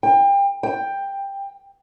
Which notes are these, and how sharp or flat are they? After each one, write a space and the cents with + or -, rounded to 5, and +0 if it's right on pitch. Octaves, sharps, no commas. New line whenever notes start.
G5 +30
G5 +10